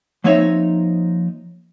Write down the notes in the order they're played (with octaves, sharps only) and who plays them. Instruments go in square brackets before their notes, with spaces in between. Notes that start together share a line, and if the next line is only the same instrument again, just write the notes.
[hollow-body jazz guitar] F3 A#3 C4 D#4 C#5 E5